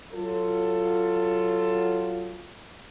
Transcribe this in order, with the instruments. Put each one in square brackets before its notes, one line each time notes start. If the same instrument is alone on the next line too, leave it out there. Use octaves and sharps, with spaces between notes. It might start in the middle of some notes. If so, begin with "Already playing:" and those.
[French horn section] F#3 F4 A4